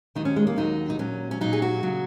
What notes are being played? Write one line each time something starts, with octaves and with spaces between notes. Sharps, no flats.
D#2 D#3 F#3 D#4
C#4
G#3
A#3
D#2 D#3 F#3 D#4
D#4
A#2 F#3 C#4
C#4
A#2 F#3 D#4
G#4
F#4
C#3 F#3